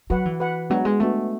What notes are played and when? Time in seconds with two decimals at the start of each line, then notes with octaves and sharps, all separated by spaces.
0.10 F#3 F#4 B4 F#5
0.25 E3
0.40 F#4 B4 F#5
0.70 F#3 G#3 B3 D4 F#4
0.85 G#3
1.00 G#3 A3 B3 D4 F#4